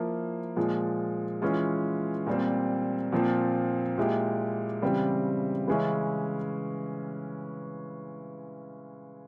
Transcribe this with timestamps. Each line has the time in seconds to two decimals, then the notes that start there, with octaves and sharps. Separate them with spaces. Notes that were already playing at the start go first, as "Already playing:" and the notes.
Already playing: F3 A#3 E4
0.56 A#2 F3 G#3
1.42 E3 G#3 C#4 F4
2.27 A#2 G3 C4
3.12 A#2 F3 C4
3.98 A#2 G#3 E4 G4
4.82 C#3 E3 G3 C4 G4
5.68 C#3 E3 G#3 C#4 E4